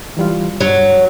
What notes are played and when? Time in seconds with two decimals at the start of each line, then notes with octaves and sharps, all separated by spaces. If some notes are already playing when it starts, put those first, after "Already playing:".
0.17 E3 G3 F4
0.60 G2 F#3